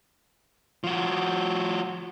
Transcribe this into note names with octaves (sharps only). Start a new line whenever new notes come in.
F3 F#4